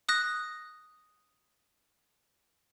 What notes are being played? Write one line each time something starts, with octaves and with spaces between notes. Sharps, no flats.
D#6 F#6 A#6